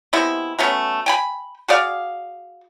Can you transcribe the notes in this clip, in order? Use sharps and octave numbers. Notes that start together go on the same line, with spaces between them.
C3 G#3 B3 E4
F#3 A3 B3 C#4
G5 G#5 B5
F#4 G#4 D5 F5